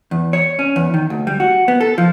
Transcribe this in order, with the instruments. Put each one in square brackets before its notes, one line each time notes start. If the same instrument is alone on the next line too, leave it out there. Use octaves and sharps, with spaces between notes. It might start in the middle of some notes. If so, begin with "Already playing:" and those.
[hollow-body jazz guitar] E2
C#5
C#4
E2
D#3
D2
G3
F#4
B3
A4
F3